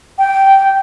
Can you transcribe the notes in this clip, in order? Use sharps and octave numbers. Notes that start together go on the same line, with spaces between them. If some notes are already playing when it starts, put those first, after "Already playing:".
G5